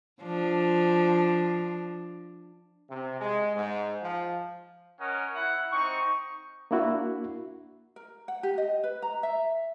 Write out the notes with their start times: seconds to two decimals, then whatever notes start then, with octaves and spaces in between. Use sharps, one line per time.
0.22 F3 D4
2.90 C3
3.20 G#3
3.56 G#2
4.01 F3
5.00 C#4 A#4 C#5 D#5 F#5
5.33 E4 F#5
5.71 C4 D#4 C#6
6.71 A#3 D4 E4 F#4
7.96 A#4
8.28 F#5
8.43 G4
8.58 D#5
8.84 B4
9.02 A#5
9.23 E5